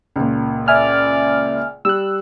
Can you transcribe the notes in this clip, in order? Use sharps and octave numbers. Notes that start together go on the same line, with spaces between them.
C#2 A#2
D5 E5 G#5 F6
G3 E6 F#6